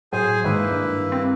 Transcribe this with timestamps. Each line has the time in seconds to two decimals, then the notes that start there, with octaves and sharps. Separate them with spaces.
0.13 A2 F#3 G#4 C5 G#5
0.44 G#2 D#3 A#3 E4 B4
0.71 G2
1.12 C4